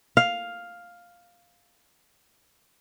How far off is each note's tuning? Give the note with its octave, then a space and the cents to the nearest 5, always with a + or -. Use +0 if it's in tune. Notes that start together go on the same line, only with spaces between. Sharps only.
F5 +5